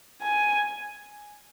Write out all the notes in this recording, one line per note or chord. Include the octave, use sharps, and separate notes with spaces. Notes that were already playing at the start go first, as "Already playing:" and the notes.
G#5